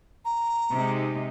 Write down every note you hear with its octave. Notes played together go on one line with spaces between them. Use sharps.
A#5
C3 G#3 D#4